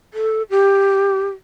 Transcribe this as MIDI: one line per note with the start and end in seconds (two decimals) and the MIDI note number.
0.14 0.42 69
0.50 1.28 67